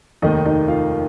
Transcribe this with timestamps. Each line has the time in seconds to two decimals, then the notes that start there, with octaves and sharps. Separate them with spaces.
0.22 F1 D#2 D#3 D#4 D#5
0.46 D#4 D#5
0.68 F4 F5